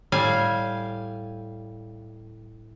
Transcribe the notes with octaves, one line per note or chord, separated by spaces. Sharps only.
A2 G3 F5 G#5